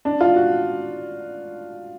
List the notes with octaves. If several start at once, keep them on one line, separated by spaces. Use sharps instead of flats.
D4
F4
F#4